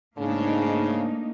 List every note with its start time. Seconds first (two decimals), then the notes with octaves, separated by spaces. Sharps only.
0.18 G#2 C#3 A3 A#3 D4 D#4